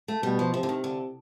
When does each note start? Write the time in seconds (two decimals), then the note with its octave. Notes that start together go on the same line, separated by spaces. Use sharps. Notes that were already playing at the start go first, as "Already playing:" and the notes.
0.08 A3
0.23 B2 G3
0.39 F3
0.54 C3 F3
0.63 D3
0.69 D#3
0.84 D3